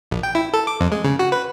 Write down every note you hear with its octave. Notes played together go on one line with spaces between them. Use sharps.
A#1
G5
E4
A4
D6
F2
G#3
C#3
F#4
B4